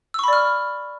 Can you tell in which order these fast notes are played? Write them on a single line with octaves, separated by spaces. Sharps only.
E6 C#6 B5 D5 F6